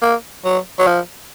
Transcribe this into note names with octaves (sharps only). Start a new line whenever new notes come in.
A#3
F#3
F#3
F3